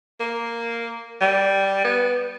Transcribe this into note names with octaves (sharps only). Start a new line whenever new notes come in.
A#3
G3
B3